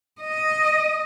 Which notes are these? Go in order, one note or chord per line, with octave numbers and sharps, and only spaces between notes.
D#5